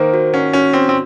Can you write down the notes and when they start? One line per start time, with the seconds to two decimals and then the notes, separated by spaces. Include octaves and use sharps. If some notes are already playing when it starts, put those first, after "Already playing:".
Already playing: D#3 A#3 C5
0.14 F#4
0.34 C#4 F#5
0.53 C#4 F#4
0.73 C4 F#4
0.89 C4